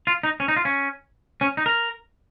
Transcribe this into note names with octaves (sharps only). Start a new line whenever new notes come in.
F4
D#4
C#4
D#4
F4
C#4
C#4
D#4
A#4